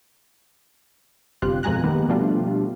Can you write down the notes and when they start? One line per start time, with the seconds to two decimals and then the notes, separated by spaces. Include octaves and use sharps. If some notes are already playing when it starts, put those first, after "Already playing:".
1.42 G1 G2 C3 F4 G4 F#6
1.63 F2 B2 G#3 G#5 A#5 F#6
1.84 D#3 G#3 A#3 B3 D#4 G4
2.09 B2 F3 G3 A3 D4 F4